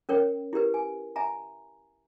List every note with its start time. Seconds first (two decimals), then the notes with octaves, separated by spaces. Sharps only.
0.09 C#4 A#4 C#5 G5
0.53 E4 G4 A#4 B4
0.74 G#5
1.16 E5 G#5 A#5